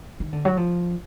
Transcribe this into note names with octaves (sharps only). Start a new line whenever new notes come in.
D#3
D3
F#3
F3